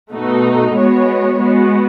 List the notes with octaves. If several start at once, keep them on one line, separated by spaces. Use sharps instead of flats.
B2 A3 D#4 F#4
G#3 B3 F#4 C#5
G#3 B3 F#4